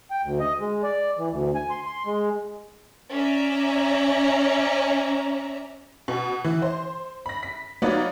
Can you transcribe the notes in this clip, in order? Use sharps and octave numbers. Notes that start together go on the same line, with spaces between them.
G5
D2
D#5
G#3
D5
E3
D2
G#5
C6
C6
G#3
C#4 D5 E5 A#5
B2
E3
C5 C6
B5 A#6
B6
F#3 B3 D#4 F4 C#5 D5